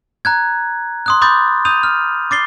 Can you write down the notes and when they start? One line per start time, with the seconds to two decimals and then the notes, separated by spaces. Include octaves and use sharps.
0.25 A#5 F#6 G#6
1.06 C6 D#6 F#6
1.22 B5 C6 D6 D#6 G6 A6
1.65 D#6 G6 D#7 F7
1.83 F6
2.31 D6 A6 C7 G7